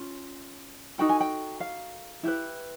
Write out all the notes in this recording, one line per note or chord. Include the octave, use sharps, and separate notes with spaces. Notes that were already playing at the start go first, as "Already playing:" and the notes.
Already playing: C#4 F4
D#4 F#4 A4 G5
G#5
G5
F5
E4 G4 B4